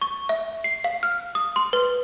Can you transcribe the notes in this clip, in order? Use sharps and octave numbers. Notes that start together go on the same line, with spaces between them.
C#6
E5
C7
F5
F6
D#6
C6
B4